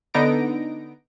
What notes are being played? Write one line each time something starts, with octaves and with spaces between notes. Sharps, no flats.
D3 B3 D#4 A#6 D7